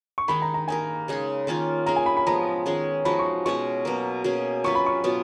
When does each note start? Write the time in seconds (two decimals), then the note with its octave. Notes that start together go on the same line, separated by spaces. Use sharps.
0.18 C#6
0.28 D#3 G#3 D#4 B5
0.42 A#5
0.54 A#5
0.68 A#3 D#4 A#4 G#5
1.08 C#3 G#3 D#4 G#4
1.47 D#3 A#3 C#4 F4
1.86 A#3 C#4 G#4 A#5
1.96 G#5
2.06 B5
2.17 B5
2.27 F3 G#3 B3 A#5
2.66 D#3 G#3 C#4 G#4
3.05 F3 G#3 D#4 F#4 B5
3.19 C#6
3.45 B2 G#3 C#4 F#4 C#6
3.85 B2 F#3 A#3
4.24 B2 A#3 C#4 G#4
4.64 F#3 C#4 F4 B4 C#6
4.75 B5
4.86 C#6
5.04 B2 F#3 B3 F4